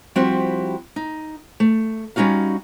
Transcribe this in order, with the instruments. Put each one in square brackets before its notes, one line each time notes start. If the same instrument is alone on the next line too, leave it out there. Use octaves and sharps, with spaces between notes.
[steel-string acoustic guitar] F3 G3 C4 E4 F#4 G4
D#4
A3
G3 C#4 D#4 F#4 F5